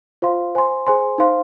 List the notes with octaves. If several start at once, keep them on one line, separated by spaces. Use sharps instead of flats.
F4 C5 F5 C6
C5 G#5 C6
G#4 C5 G#5 C6
D#4 C5 F5 C6